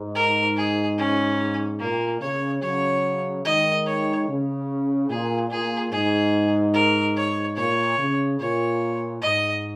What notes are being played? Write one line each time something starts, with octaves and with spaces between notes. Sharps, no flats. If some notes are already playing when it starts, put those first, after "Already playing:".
Already playing: G#2
A#4
G#4
C#4
A#2 A#3
C#3 C#5
C#3 F#3 C#5
D#3 G#3 D#5
C#5
C#3
A#2 G#4
A#2 G#4
G#2 G#4
A#4
C#5
A#2 C#5
C#3
A#2 C#5
G#2 D#5